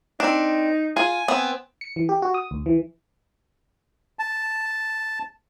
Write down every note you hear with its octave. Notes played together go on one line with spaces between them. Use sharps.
C4 D4 D#4
F4 G#5
B3 C4
C#7
E3
G4
F#4
D#6
D2
E3
A5